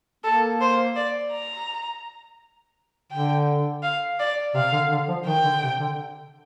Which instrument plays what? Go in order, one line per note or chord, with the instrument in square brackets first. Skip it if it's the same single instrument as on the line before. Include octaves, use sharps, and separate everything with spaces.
[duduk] A#3 [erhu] A4
[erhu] C5
D5
A#5
[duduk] D3 [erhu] G5
[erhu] F5
D5
[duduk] C3 [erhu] F5
[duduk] D3
D3
F3
[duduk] D#3 [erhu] G5
[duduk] D3
C3
D3